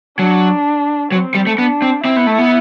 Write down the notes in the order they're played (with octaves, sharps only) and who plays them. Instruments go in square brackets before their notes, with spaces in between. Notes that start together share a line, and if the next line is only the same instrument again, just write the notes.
[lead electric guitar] F#3 [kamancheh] D4
[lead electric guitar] F#3 [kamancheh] C4
[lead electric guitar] G3
A3
[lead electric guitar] B3 [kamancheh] D4
[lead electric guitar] C4
[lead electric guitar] C4 [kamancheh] E4
[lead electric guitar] B3
A3
B3